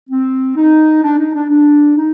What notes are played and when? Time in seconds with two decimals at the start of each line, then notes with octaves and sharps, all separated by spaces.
0.10 C4
0.57 D#4
1.03 D4
1.19 D#4
1.34 D4
1.50 D4
1.97 D#4